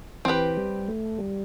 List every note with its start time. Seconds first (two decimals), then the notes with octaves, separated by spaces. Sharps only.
0.25 E3 C4 G4 B4
0.57 G3
0.88 A3
1.18 G3